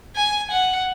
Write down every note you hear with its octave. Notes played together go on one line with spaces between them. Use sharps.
G#5
F#5